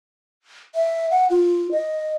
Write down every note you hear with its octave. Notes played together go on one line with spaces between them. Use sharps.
E5
F#5
F4
D#5